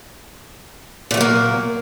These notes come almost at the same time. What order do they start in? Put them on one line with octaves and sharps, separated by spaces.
A#2 A3 F#3 A#3